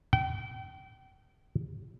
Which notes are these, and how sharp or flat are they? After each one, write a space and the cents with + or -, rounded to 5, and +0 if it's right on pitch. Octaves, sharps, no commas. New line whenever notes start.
G5 -30